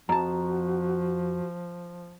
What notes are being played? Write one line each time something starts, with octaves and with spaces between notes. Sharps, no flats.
F2 F3 F#4 A5 A#5